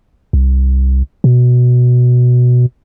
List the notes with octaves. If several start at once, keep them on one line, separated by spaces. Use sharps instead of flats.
C2
B2